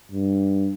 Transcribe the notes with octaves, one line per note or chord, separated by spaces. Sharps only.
G2